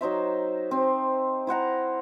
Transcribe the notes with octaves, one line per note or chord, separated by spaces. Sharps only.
F#3 D#4 C5 E5
C4
E4 C5 F#5 A#5